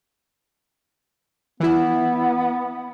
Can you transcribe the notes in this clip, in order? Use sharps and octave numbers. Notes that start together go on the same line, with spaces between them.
E3 B3 E4